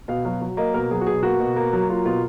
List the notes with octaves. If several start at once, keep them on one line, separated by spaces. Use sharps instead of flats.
B2 F5
F#3 F5
F#3
A#3 D#5
B2 A#4
F#3 G#4
F#4
B2 G#4
A#3 F#4
B2
A#3
F#3
A#3 F4
B2 F4